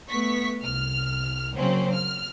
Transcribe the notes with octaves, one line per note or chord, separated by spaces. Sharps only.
A3 B3 C#6 B6
C2 F6
C#3 F#3 A#3 C4 C#4
F6